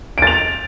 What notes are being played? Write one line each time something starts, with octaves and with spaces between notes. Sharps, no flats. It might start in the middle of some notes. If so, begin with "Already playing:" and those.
A6 D7 F7